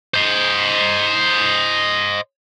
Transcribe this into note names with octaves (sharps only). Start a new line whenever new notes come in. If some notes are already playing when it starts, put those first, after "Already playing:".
C5 D#5